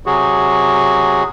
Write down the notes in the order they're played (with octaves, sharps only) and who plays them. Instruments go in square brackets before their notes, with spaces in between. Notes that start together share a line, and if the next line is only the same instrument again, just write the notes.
[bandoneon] C3 F#3 F#4 G#4